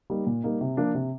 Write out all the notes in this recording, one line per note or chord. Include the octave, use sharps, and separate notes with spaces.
G3 A#3 D#4
A#2
G3 A#3 D#4
C3
F3 A#3 D4
C3